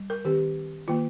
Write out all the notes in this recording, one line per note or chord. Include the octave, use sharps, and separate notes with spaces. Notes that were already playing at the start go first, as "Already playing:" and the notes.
Already playing: G3
A#4
D#3 C4 G4
D#3 A#3 F4